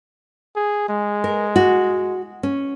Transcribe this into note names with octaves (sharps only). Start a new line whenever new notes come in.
G#4
G#3
A#4
F#4
C#4